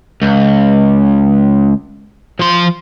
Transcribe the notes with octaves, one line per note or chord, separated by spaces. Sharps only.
C#2
F3 C6